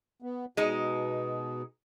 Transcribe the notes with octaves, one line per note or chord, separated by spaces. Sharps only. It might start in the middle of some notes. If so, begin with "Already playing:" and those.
B3
B2 G#3 D#4